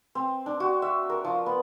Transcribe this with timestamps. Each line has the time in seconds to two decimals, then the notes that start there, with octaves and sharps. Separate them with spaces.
0.15 C4
0.46 D4
0.60 F#4
0.82 E5
1.10 A#4
1.25 F3
1.46 B3